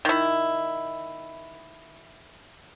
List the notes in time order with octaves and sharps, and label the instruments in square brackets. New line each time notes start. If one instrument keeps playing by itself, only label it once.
[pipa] D#3 E4